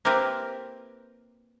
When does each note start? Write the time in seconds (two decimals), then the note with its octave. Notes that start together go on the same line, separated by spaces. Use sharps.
0.05 A#3 C4 E4 G4 A#4 B4